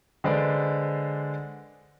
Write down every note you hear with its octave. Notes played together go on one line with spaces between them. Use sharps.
D3 G#3 B4 C5 D5